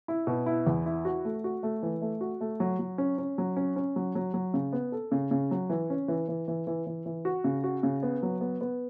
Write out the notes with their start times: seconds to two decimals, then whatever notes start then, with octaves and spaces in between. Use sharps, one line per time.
0.08 E4
0.27 B2
0.46 E4
0.67 E2
0.86 E4
1.05 F#4
1.25 A3
1.44 F#4
1.63 A3
1.83 E3
2.02 A3
2.21 F#4
2.41 A3
2.60 F#3
2.79 F#3
2.98 C#4
3.18 C#4
3.38 F#3
3.57 C#4
3.76 C#4
3.96 F#3
4.15 F#3
4.34 F#3
4.54 C#3
4.73 B3
4.92 A4
5.12 C#3
5.31 C#3
5.51 F#3
5.69 E3
5.90 C#4
6.08 E3
6.28 E3
6.48 E3
6.67 E3
6.86 E3
7.06 E3
7.25 F#4
7.44 C#3
7.64 F#4
7.83 C#3
8.03 B3
8.23 F#3
8.41 B3
8.61 B3